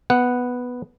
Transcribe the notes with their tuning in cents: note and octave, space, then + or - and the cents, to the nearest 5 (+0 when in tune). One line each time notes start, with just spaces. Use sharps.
B3 +0 F#5 +0